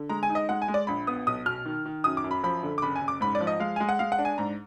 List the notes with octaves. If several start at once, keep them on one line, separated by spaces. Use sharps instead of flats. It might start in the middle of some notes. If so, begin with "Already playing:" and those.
Already playing: D3
G#3 A#5
G#5
D#4
D#5
G#3 F#5
G#5
G#3
D5
A#1 B5
B3 D#6
B1 D#6
B2 F6
D#3
D#3
F#2 D#6
D6
F#2
B5
F3 B5
D3
D6
F#1 B5
G#5
F#1
D6
G#2 B5
D5
F3
D#5
G#3 F5
G#3 G#5
F#5
G#3 F5
F#5
D4
G#5
G#2 A#5